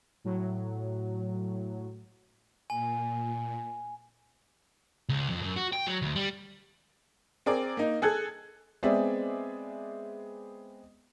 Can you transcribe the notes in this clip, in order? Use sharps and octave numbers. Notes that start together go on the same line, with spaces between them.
A2 F#3
A#2 G#5
C#2
F2
F#2
F#4
G5
F#3
D2
G3
C4 G#4 A#4 D5
A#3 D#4
G#4 A4 F#6 G#6
G#3 B3 C4 G#4 D5 E5